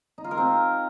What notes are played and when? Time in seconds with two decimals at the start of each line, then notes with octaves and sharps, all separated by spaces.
0.18 D#4
0.24 F4
0.31 A#4
0.38 C4